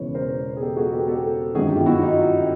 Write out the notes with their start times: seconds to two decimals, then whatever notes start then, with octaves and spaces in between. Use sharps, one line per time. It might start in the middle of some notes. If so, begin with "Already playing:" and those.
Already playing: E1 E2 C#3 E3 B4 C#5
0.14 A#4 C5
0.57 G#4
0.62 G4 A4
0.77 F#4 G#4
0.93 G4 A4
1.08 G4 A4
1.55 G1 F#2 D#3 F#4 G#4
1.71 F4 G4
1.86 E4 F#4
2.02 D#4 F4